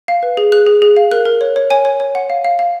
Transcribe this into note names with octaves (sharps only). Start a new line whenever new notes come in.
F5
B4
G#4
G#4 F#6
G#4
G#4
F5
A#4 F#6
A#4
C#5
C#5
C#5 G#5
C#5
C#5
F#5
F5
F5
F5